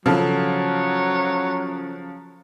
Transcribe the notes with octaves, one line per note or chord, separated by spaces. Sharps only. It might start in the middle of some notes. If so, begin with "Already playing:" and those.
C#3 F3 F#3 A4